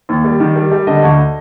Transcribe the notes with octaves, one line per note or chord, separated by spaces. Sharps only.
D#2
G3
D#3
G3
G3
D3 D#5
D2